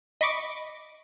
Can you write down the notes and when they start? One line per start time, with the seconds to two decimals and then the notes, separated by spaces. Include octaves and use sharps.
0.21 D#5 B5 C#6 D6